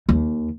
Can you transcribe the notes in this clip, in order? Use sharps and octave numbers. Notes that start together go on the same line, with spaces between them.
D#2